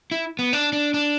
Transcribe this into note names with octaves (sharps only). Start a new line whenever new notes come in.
E4
B3
D4
D4
D4